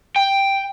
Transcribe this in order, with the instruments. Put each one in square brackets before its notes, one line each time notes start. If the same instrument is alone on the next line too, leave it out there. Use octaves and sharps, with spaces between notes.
[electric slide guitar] G5